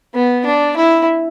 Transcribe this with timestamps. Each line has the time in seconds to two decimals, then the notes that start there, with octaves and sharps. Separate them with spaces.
0.15 B3
0.45 D4
0.76 E4